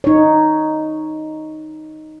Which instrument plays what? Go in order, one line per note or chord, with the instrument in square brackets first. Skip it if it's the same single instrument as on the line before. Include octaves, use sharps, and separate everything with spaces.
[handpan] D#4 C#5